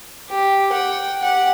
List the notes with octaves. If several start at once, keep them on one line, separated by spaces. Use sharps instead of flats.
G4
F#5 G5
G4 F#5